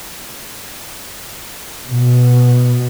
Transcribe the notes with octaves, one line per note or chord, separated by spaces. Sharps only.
B2